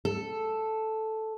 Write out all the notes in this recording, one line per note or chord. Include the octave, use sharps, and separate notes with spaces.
A4